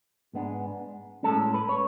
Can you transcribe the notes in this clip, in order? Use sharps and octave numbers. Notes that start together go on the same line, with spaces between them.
G#2 G#3 B3 D4
A2 G#3 C#4 A4
B4
C#5